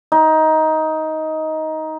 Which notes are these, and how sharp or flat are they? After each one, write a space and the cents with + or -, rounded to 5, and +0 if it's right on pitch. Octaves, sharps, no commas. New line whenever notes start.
D#4 +15